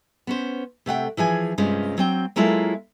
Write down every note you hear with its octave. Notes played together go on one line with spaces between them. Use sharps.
B3 C#4 C5
C3 A3 F#5 G5
E3 F3 G#4 G#5
G2 C3 G#3 C#4 F4
F#3 C4 G5
F#3 G#3 A#3 E4 F4 A4